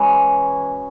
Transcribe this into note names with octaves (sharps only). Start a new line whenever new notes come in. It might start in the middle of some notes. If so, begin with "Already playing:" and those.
Already playing: E3 G#3 C#4 E4 F#4